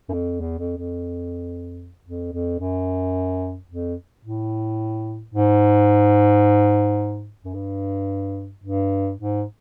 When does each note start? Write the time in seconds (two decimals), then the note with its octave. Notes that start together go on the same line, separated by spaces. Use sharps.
0.09 F#2
0.13 F2
0.40 E2
0.59 F2
0.77 F2
2.05 F2
2.33 F2
2.59 F#2
3.70 F2
4.24 A2
5.34 G#2
7.44 F#2
7.54 G2
8.64 G2
9.18 G#2